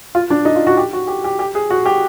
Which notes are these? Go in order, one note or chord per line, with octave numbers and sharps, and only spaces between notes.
F4
D4
D#4
F4
F#4
G4
F#4
G4
G4
G4
G#4
F#4
G4